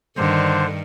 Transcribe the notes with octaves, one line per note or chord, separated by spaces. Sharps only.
G2 D3 D#3 C5